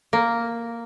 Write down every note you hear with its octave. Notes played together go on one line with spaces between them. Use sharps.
A#3